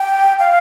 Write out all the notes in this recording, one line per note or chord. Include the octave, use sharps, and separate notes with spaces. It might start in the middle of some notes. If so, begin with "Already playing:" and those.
Already playing: G5
F5